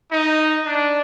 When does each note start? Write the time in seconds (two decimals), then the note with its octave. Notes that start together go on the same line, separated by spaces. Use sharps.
0.11 D#4
0.64 D4